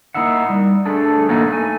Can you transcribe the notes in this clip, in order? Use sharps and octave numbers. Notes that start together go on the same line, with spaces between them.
A#3 D#4 E4 E5 F#5
G3
A3 D4 G#4 A4
F#3 A3 A#3 D#4
A3 G#5